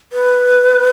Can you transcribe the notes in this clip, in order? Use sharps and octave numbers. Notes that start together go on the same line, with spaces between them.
B4